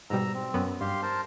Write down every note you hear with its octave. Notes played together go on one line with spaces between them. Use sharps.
G#2 B2 G3 A#5 E6
C4
F#2 B3
G2 G4 F5 C6
A#4 C5 A5